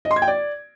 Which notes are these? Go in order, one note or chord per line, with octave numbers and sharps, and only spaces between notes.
D#5
C6
G#6
G5
D5